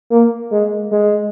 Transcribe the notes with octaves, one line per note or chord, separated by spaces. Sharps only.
A#3
G#3
G#3